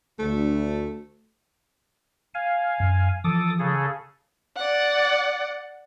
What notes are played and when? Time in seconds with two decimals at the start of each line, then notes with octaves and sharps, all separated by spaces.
0.19 D2 A3
2.34 F5 G#5
2.80 F#2
3.24 E3 F3 A4 D6 D#6
3.59 C#3 G#4 A4
4.57 D5 F#5